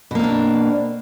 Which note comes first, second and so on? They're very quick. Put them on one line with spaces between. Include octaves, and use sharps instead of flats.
B2 A#3 C4 D4